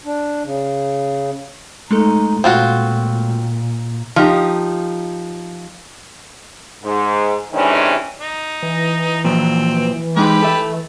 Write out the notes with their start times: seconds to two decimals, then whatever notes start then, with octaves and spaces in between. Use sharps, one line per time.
0.05 D4
0.44 C#3
1.91 G#3 A3 D#4 A4
2.44 A#2 C4 F4 F#4
4.16 F3 D#4 G4
6.83 G#2
7.53 C3 D#3 E3 G#3 C#4 D4
8.20 D#4
8.63 E3
9.24 A#2 F3 F#3 C4
10.17 G#3 D#4 G4 B4 D6
10.42 A4 E5